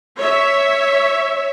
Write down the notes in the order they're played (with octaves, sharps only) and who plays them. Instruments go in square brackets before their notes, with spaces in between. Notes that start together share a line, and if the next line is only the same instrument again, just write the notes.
[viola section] C#5 E5